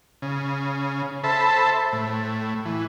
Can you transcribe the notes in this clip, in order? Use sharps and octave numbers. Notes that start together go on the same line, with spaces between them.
C#3
A4 C5 E5 A5 B5
A2
E3